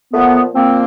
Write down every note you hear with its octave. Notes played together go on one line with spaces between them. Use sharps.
A#2 F3 A3 B3
A#2 F3 A#3 C4